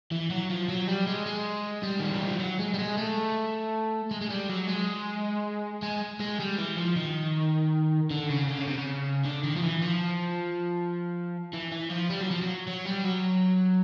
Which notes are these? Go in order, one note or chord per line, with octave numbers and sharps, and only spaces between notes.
E3
F#3
F3
F#3
G3
G#3
G#3
G3
D#3
E3
F3
F#3
G#3
G3
G#3
A3
G#3
G#3
G3
F#3
G#3
G#3
G#3
G3
E3
F3
D#3
D3
C#3
D3
C#3
C3
C#3
D3
D#3
F3
E3
F3
E3
E3
F3
G3
F#3
F3
F#3
F#3
G3
F#3